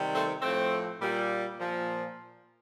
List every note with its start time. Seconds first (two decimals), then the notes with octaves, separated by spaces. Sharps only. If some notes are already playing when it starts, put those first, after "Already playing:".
Already playing: C3 D#3 G3
0.13 A3 C4
0.42 A2 F3 A3 C4
1.00 A#2 G3
1.57 A#2 F3